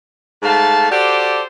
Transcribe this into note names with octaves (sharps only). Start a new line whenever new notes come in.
G#2 A3 F5 A5
F#4 G4 A4 C5 D5